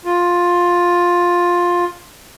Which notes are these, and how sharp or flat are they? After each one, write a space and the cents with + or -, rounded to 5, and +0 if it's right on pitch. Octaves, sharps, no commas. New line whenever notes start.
F4 +10